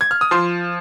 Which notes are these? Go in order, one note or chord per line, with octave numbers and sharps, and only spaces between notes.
G#6
F6
D#6
F3 C6